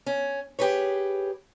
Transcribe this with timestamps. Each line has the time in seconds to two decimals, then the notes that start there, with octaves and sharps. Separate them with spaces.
0.06 C#4
0.59 G4 G#4 B4 C#5